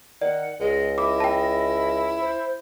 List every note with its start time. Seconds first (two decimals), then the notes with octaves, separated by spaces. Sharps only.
0.22 D#3 D5 F#5
0.60 C#2 G#3 D#5
0.98 E4 D6
1.20 G5 A5
2.20 C5